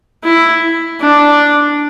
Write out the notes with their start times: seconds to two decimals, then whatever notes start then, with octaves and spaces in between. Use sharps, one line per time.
0.23 E4
1.00 D4